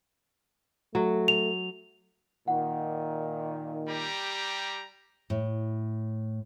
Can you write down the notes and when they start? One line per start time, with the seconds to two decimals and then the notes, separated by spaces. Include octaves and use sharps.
0.95 F#3 A3
1.28 F7
2.48 A#2 D#3 F#5
3.88 G3 G4 A#5
5.30 A2